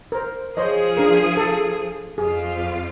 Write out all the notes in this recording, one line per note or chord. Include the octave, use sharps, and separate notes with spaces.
A#4 C5
F3 G#4 C5 C#5 D#5
D4 A#4
A4
F2 F4 G#4